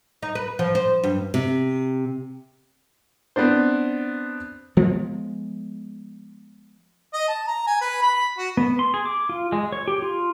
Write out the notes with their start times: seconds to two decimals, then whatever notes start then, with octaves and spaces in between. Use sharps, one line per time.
0.23 D#4
0.35 B4
0.59 F3
0.75 C5
1.03 G2
1.34 C3
3.36 B3 C4 D4 C5
4.77 F3 G#3 B3
7.13 D#5
7.28 A5
7.47 A#5
7.67 G#5
7.81 B4
8.02 B5
8.38 F#4
8.57 B3
8.79 C6
8.94 G#4
9.06 D6
9.29 F4
9.52 G#3
9.72 C#5
9.88 G4
10.02 F4